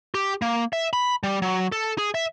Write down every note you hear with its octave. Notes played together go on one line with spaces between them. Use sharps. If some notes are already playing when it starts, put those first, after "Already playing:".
G4
A#3
E5
B5
G3
F#3
A4
G#4
E5